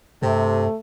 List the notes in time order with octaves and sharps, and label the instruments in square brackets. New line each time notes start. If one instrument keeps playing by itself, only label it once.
[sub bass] G2 [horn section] C3 [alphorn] A3